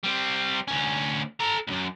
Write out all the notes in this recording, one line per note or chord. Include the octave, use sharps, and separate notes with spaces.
G3 C4
D2 C#4
A4 A#5
C#2 F#2